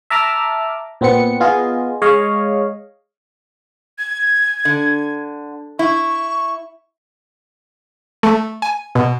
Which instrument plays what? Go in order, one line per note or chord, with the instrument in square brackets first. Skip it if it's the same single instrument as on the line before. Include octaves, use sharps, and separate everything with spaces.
[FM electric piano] E5 A5 A#5 D6 F6
A#2 B3 C4 B4 C#7
B3 F4 G#4 D#5
G#3 C#5 D#5 F5
[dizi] G#6
[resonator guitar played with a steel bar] D3
[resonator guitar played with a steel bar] E4 [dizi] C#6
[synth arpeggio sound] A3
G#5
B2